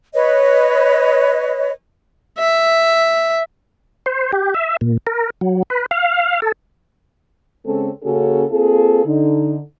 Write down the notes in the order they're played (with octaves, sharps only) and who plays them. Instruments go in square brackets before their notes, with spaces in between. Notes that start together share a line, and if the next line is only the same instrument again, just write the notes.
[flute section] B4 C#5 D#5
[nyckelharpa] E5
[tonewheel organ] C5
G4
E5
A#2
A#4
F#3
B4
F5
A4
[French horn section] C#3 G#3 C4 C#4 A4
C#3 A#3 C#4 F#4 G#4 A4
A#3 C4 F4 G#4 A4
D3 D#4